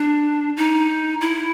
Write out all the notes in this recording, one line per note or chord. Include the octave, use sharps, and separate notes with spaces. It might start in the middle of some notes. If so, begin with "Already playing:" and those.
Already playing: D4
D#4
E4